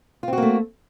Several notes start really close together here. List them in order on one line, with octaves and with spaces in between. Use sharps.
F4 C4 F#4 A#3 A3